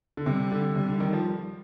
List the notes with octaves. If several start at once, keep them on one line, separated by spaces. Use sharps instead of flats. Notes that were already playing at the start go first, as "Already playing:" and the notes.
D3
C3 G3
D3
C3 G3
D3
D#3
F3